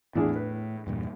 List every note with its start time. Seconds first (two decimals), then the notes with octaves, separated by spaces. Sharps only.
0.16 E2 A2 D4 G#4
0.36 B4
0.87 E2 G2 A#2